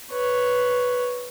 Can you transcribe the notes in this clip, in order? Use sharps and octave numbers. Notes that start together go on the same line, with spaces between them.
B4 C#5